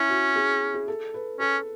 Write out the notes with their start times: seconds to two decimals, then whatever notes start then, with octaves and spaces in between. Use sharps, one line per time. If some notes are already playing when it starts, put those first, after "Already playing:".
Already playing: C#4 E4
0.09 F#4
0.36 G#4
0.74 G#4
0.88 A4
1.14 B4
1.40 C#4 A4